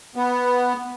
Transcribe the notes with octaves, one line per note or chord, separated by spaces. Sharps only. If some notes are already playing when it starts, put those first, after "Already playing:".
B3